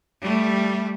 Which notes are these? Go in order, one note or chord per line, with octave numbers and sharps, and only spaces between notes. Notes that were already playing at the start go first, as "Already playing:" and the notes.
G3 A3